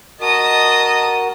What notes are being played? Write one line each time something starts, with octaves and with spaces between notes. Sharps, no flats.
F#4 A#4 D#5 A5 D#6